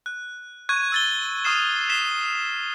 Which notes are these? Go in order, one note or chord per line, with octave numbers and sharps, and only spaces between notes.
F#6
C#6 F#6 G#6 D#7
E6 A6 G7
C#6 D#6 F6 C7 E7
B6 C7 E7 G7